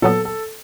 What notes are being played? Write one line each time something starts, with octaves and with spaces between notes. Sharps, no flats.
A#2 F#3 B3 A4
A4